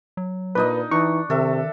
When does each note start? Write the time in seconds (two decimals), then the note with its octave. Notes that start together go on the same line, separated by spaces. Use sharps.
0.17 F#3
0.55 A#2 D4 D#4 B4 D#5
0.91 E3 D4 D#4 C#6
1.30 C3 D#3 A4 E5